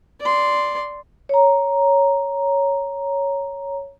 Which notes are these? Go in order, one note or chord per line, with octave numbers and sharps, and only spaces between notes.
D5 C6
C#5 A#5